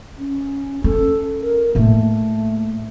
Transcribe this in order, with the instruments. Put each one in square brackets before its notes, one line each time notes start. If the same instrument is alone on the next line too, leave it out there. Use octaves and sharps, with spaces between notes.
[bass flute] C#4
[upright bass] C#4 [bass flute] A4
[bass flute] A#4
[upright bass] A2 A#3 [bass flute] A3